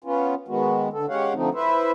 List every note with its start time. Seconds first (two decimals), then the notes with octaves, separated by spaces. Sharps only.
0.04 B3 C#4 F4
0.48 D#3 G#3 B3 F#4
0.93 D3 A4
1.09 G#3 C#4 G4 C#5 F5 F#5
1.34 D3 F3 A3 C4 D#4
1.54 E4 B4 C5 E5